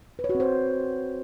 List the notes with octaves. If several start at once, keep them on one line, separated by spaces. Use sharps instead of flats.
B4
C#5
F#4
C4
C5